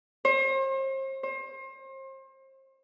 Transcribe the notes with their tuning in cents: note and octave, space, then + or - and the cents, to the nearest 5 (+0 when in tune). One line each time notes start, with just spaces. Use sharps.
C5 +40
C5 +35